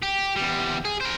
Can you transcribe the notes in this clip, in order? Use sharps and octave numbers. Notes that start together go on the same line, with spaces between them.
G4
E2 G3
G#4
A#4 C5